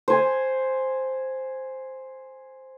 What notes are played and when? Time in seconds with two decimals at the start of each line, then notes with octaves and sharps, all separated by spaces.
0.08 C5 G#5